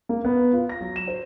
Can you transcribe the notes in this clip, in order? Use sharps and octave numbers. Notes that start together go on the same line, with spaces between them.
A#3
B3
F4
A#6
F#3
E7
C5